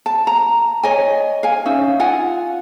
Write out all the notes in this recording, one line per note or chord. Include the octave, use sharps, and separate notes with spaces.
A5
A#5
C#5 D#5 G#5
F5 G#5
C#4 D#4 E5
F4 F#5 G#5